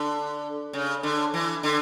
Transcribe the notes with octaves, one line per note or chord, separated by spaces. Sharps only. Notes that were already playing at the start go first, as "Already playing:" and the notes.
Already playing: D3
C#3
D3
E3
D3